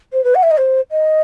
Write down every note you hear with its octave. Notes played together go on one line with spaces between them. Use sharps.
C5
B4
F#5
E5
D#5
C5
D#5